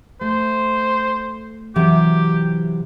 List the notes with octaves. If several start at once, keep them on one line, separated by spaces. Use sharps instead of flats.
A3 C5
C3 E3 F#3 G4